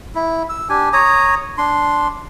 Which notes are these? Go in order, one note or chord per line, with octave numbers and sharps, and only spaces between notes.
E4
E6
D4 G4 G#5
C#5 A#5 D#6
D4 C6